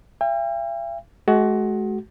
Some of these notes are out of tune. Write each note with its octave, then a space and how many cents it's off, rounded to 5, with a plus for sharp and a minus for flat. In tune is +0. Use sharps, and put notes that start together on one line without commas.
E5 +45 G5 +40
G#3 +40 F#4 +20